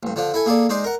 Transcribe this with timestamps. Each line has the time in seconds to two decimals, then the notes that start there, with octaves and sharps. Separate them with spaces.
0.03 A1 G2
0.16 D3 F3 D4
0.34 E4 A4 G#5
0.46 A#3 G#4 A4 D5
0.69 G#3 D#4 C5 D5
0.84 A#4 F#5